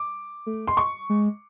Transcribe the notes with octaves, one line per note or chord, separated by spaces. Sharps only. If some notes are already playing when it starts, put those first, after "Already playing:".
Already playing: D6
A3
C6
C#6
G#3